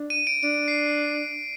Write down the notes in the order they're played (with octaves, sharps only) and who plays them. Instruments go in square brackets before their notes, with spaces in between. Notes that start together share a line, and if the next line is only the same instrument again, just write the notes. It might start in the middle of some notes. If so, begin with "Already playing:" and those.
Already playing: [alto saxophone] D4
[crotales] D#7
D7
[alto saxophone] D4 [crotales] D7
[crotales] C7